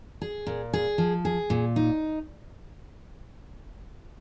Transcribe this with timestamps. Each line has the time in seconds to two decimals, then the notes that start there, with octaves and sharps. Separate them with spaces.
0.21 G#4
0.47 A#2
0.73 G#4
0.98 F3
1.25 G#4
1.50 A#2
1.76 D#4